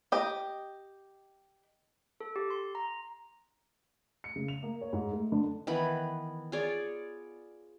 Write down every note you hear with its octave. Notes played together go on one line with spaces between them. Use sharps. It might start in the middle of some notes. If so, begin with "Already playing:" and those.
G4 D#5
A4
G4
C6
A#5
C#7
C#3
F7
A#3
C#5
G#2
A3
D3
D#3 E3 B3 B5
F4 G#4 C#5 D5